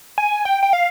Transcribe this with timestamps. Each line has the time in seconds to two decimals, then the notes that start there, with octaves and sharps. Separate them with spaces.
0.18 G#5
0.45 G5
0.63 G5
0.73 F5